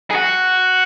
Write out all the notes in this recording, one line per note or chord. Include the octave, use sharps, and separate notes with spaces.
G#4
F#4